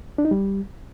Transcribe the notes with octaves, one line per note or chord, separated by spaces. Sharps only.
D4
D#4
G3